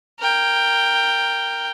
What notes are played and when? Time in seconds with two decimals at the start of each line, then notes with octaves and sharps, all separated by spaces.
0.20 A#4 G5